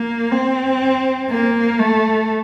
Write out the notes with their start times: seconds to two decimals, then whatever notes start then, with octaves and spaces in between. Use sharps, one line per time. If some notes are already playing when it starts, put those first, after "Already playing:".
Already playing: A#3
0.32 C4
1.30 A#3
1.79 A3